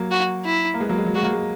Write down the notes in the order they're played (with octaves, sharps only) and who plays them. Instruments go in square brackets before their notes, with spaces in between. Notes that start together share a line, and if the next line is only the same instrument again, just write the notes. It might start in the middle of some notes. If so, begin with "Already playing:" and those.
Already playing: [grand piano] F#3 A#3
[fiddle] F#4
E4
[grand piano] A#3
G#3 B3
F#3 A#3
G#3
F#3
[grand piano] G#3 [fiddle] F#4
[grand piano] F#3 A#3
G#3